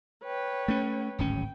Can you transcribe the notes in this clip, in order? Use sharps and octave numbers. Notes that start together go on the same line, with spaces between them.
B4 C#5 G5
A3 C#4
D1 G#1 C#4 G5